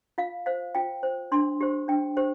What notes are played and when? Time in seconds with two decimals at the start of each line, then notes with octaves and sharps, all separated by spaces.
0.18 F4 F5
0.46 C5 F5
0.75 F4 G5
1.03 C5
1.32 D4 C6
1.61 G4 C5
1.88 D4 G5
2.17 G4 C5